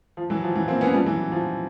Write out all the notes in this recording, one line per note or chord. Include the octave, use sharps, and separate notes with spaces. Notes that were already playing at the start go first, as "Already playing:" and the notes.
F3
E3 F#3
F3
E3 F#3
A#3 C4
B3 C#4
F3 G3
E3 F#3
F3